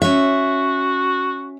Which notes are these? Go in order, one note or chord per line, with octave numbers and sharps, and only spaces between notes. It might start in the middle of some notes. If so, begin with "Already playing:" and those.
C#4 F#4 E5